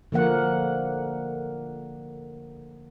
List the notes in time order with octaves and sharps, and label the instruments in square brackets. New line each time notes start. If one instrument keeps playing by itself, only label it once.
[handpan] D3 F3 A#3 F#5